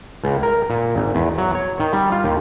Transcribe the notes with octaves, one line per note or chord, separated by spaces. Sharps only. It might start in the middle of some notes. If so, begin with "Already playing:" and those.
C#2
A#4
A#2
G#1
E2
F#3
C#5
D#3
G3
F4
D#2